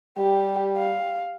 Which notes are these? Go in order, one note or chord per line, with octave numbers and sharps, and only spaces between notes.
G3 G4
F5